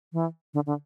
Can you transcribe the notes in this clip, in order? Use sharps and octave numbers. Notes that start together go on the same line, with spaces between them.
E3
D3
D3